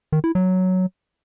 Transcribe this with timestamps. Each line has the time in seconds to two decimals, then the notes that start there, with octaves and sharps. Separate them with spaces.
0.12 D#3
0.24 E4
0.35 F#3